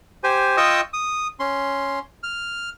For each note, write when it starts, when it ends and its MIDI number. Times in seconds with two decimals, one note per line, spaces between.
0.24 0.57 67
0.24 0.57 72
0.24 0.57 80
0.57 0.81 65
0.57 0.81 75
0.57 0.81 79
0.57 0.81 85
0.57 0.81 87
0.57 0.81 88
0.93 1.28 87
1.40 1.99 61
1.40 1.99 84
2.23 2.70 89